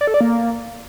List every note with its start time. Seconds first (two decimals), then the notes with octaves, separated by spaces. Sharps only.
0.01 D5
0.07 A4
0.14 D5
0.21 A#3